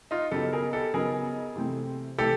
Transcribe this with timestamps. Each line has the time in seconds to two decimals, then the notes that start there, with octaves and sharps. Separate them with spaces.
0.11 D#4 F4
0.31 C#3 F#3 B3 D#4 G4 A4
0.53 G#4 A#4
0.73 G4 A4
0.94 C#3 F#3 B3 D#4 G#4 A#4
1.56 C3 E3 A3 C4
2.18 C3 E3 A3 G4 A4